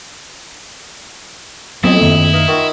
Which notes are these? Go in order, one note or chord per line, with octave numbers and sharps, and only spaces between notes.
F2 A2 F#3 G#3 B3 C4 E4
F#2 D#3 A#3
D#4 B4 F5
D#3 F4 F#4